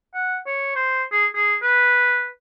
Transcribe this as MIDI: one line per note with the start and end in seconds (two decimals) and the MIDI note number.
0.14 0.37 78
0.46 0.72 73
0.76 1.04 72
1.12 1.26 68
1.35 1.56 68
1.62 2.28 71